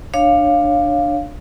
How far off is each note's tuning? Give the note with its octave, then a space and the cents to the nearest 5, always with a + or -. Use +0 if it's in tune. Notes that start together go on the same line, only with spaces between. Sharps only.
D4 +15 C#5 +0 F5 +0